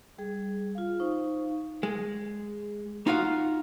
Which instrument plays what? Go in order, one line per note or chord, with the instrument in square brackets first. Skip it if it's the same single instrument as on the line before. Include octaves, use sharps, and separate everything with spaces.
[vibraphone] G3 G#4
F4 F5
D#4 C5 F5 C#6
[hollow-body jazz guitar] G#3
D#4 F4 F#4 F5